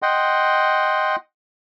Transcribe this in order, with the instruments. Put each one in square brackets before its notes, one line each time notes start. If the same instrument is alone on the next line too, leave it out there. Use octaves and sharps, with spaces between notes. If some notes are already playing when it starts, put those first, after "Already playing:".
[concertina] D#5 F#5 G5 C6